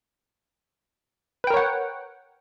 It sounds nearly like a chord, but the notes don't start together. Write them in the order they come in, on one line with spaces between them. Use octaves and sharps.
B4 G5 A#4 C#5 F#5